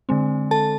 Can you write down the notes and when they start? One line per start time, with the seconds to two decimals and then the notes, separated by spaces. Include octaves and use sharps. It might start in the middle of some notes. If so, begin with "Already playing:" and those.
0.09 D3 G#3 C4
0.51 A4 A5